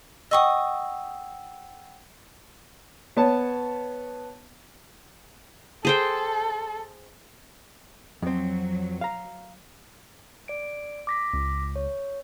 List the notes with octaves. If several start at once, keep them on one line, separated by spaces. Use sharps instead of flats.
D#5 F#5 G5 C#6 D#6 E6
B3 C#5 A5
G#4 A4 C5 G5
F2 F#3 C4
F5 A#5
D5 D7
D6 A#6 B6
C#2
C#5